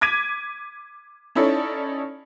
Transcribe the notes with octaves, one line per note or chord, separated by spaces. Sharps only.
D6 G#6 B6 D#7
C#4 D#4 E4 A4 C#5 D5